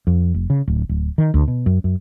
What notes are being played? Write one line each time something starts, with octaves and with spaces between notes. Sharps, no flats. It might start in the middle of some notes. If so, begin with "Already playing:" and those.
F2
F1
C#3
D1
D1
D#3
D2
B2
F#2
F#2